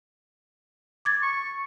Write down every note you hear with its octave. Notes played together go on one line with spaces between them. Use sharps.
D6 G#6 A6
C#6